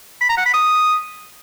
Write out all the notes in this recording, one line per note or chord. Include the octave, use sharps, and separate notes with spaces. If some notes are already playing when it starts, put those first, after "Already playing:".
B5
A#5
F#5
B5
D#6